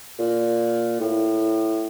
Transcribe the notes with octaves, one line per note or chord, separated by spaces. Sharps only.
A#2
A2